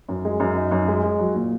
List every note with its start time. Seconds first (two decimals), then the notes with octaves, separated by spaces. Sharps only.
0.09 F#2
0.25 G#3
0.40 F#2
0.56 D#4
0.71 F#2
0.88 G#3
1.04 G#3
1.19 F#3
1.35 A#2